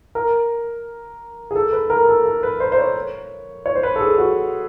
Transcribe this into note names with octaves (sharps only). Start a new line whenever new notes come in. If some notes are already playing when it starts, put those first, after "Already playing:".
A#4
G#4
A4
B4
A#4
A4
A4
B4
C5
C5
C#5
C#5
C5
B4
A4
G#4
F#4